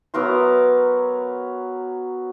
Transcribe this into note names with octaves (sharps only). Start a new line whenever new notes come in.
F#3 B3 A#4 C6